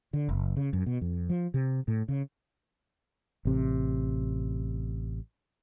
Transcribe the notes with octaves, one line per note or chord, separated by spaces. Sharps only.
D3
F#1
C#3
F#2
B2
F2
F3
C3
A2
C#3
A1 C3